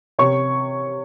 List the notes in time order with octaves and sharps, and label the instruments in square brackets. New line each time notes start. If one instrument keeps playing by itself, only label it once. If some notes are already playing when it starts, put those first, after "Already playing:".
[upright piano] C3 C#5 C#6